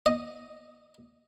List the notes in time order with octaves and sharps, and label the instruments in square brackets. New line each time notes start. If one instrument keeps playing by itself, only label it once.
[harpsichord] D#5